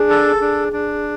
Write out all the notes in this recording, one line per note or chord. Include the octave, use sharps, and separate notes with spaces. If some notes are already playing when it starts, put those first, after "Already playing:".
Already playing: D4 G#4
A4
D4
D4